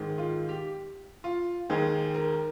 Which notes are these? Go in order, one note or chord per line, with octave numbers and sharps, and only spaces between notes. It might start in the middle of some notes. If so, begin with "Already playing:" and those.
Already playing: G#2 D#3 G#3
F4
G4
F4
D#2 D#3 G#3 G#4
A#4